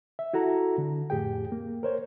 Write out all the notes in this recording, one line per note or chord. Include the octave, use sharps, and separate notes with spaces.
E5
E4 F#4 A4 A#5
D3
F2 A2 G4 G#4 G5
A#3
A#4 C5 C#5